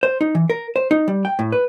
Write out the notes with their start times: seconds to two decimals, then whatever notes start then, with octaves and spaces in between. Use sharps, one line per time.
0.03 C5
0.21 D#4
0.35 E3
0.50 A#4
0.76 C5
0.91 D#4
1.08 G3
1.25 G5
1.39 A2
1.52 B4